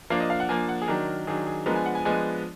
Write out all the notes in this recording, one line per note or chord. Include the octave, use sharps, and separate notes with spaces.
F3 A#3 D4 F5
D#5
F5
F#5
F3 A#3 D4 G#5
F#5
G#4
D#3 F#3 D4 A#4
D#3 F#3 D4 G#4
G#4
F3 G#3 B3 D4 A#4
G#5
F#5
G#5
F3 G#3 B3 D4 G#5